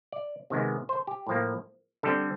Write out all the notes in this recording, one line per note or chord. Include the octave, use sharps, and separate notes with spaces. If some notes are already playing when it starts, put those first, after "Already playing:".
D5
C3 D#3 G#3 B3
C5
G4
A2 F3 A#3
D3 G3 C4 A4